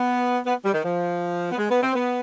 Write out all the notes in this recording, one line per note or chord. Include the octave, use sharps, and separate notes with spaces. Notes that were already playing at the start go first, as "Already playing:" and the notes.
Already playing: B3
B3
G3
D#3
F3
B3
G#3
B3
C4
B3